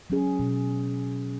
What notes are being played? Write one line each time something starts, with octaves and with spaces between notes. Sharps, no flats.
F#3 C#4 G#4
B2